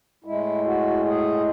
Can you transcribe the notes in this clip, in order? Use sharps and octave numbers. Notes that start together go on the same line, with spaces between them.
A2 G#3 E4
F#4
G#4